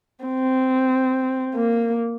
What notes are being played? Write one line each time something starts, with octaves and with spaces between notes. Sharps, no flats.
C4
A#3